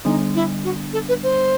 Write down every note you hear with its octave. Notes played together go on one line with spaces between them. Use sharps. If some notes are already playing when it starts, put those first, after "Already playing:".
D3 G3 B3 D4 D#4
E4
F#4
A4
B4
C5